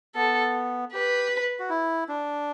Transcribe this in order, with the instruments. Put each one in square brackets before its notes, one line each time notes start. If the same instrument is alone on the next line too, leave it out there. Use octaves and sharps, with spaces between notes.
[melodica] B3 [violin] A4
[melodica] G4 [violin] B4
[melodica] F#4
E4
D4